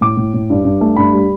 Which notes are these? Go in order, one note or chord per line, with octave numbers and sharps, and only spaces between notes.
A2 D6
A2
A2
G2
G2
A3
G2 B5
G3